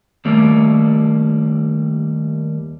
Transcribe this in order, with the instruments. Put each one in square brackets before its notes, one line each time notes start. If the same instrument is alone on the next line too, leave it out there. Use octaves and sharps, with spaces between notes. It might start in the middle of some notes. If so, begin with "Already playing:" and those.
[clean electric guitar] D#2 G3 A3 A#3